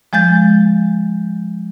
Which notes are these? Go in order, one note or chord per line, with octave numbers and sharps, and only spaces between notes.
F3 G#3 G6 A6